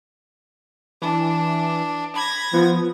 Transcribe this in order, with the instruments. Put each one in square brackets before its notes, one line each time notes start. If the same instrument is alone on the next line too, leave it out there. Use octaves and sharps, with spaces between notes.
[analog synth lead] E3 [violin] D4
[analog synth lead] B5 [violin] G#6 A#6
[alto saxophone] F3 [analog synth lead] B3